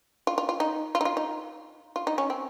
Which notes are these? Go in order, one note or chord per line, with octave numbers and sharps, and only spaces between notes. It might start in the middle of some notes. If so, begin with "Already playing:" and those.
F4
F4
F4
D#4
F4
D#4
F4
D#4
F4
D#4
C#4
C4